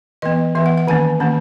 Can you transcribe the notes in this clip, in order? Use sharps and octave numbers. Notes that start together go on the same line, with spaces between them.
E3 B3 D#5
E3 B3 E5
F#5
F#5
D#3 A#3 C#4 G#5
D#3 A#3 C#4